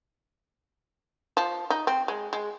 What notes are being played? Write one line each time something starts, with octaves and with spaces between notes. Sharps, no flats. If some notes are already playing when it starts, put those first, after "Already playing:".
F3
D#4
C4
G#3
G#3